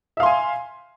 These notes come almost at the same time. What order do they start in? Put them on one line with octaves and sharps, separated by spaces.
E5 F5 C6 G#5